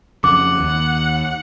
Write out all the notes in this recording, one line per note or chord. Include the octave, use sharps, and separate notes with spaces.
F2 C#3 F#5 D6
D#2